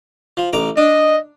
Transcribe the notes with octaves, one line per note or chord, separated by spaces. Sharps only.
F3
A1 A#5 D6
D4 D#5